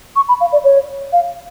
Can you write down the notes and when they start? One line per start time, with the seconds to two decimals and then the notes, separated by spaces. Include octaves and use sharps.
0.16 C#6
0.28 B5
0.41 F5
0.52 D5
0.64 C#5
1.12 F5